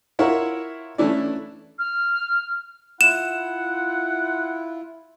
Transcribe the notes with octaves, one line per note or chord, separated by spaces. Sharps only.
E4 F4 A#4 C#5 E5 F#5
E3 A3 C#4 D4 E4 D5
F6
E4 F4 F#5 E7